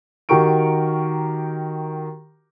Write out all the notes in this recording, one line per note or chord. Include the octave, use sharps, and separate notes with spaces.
D#3 F#4 G4 A#4 C#6 D7